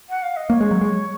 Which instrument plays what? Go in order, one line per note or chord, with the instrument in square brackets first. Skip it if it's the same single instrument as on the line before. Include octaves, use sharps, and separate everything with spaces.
[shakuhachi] F#5
F5
D#5
[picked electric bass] A#3 [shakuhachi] C#5
[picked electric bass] G#3
F#3
G#3